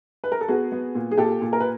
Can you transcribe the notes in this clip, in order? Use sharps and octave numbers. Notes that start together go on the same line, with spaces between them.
B4
A#4
A4
B3 F#4 G#4
B3
A#2
G#4
A#2 G4 A4
A#2
A#4
B4